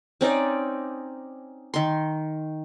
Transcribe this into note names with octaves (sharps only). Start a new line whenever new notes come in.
C4 C#4 D#4 D5
D#3 C6